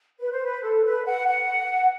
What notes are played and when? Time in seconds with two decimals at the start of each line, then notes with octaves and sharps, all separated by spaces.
0.18 B4
0.31 C5
0.44 B4
0.62 A4
0.84 B4
1.04 F#5
1.27 F#5